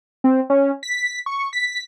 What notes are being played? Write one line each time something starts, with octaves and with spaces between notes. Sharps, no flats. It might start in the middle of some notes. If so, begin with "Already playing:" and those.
C4
C#4
B6
C#6
B6